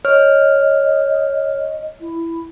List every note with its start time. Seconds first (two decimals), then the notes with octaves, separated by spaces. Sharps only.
0.05 C#5 D#5 F6
2.00 E4